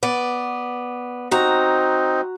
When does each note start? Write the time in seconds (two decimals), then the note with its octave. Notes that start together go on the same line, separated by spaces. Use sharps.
0.03 B3 D5
1.31 C4 D#4 F#4 A#5